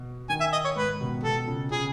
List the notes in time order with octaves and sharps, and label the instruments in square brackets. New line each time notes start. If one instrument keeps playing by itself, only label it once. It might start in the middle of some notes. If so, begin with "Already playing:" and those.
Already playing: [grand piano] B2
[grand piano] D#3 [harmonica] G#5
[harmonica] E5
D#5
C#5
[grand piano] G#2 [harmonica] B4
[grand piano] B2
[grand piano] B2 [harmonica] A4
[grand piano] C#3
[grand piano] C#3 [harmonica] G#4